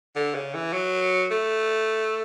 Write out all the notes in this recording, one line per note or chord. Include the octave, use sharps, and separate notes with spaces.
D3
C#3
E3
F#3
A3